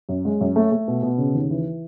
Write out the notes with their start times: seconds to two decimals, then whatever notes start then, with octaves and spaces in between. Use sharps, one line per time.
0.09 F#2
0.25 G#3
0.41 F#2
0.56 A3
0.72 A3
0.88 B2
1.03 B2
1.18 C#3
1.34 D#2
1.50 E3